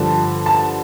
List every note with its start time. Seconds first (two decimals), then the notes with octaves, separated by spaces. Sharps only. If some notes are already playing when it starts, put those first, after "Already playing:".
Already playing: G2 D3 F3 A5
0.46 A5